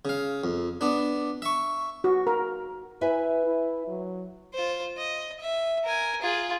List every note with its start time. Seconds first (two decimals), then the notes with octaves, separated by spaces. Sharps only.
0.05 C#3 F5
0.44 F2
0.81 B3 D4
1.42 E5 C#6
2.04 F#4
2.27 A#4
3.01 E4 B4 E5 G#5
3.47 E4
3.88 F#3
4.54 F4 C5
4.97 D#5
5.40 E5
5.84 A#4 G#5
6.22 F4 G#4